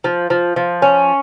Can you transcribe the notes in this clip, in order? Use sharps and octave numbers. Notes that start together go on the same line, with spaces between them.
F3
F3
F3
C#4